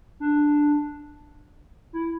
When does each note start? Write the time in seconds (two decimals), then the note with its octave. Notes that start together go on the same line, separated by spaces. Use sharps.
0.20 D4
1.93 E4